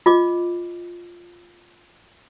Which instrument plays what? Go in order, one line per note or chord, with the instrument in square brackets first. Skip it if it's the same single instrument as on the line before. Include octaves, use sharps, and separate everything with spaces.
[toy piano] F4 D#5 D6